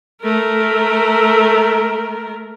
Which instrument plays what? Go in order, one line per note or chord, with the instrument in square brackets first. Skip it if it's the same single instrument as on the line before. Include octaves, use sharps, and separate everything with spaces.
[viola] A3 A#4